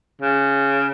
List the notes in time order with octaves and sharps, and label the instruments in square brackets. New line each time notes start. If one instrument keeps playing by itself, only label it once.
[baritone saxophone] C#3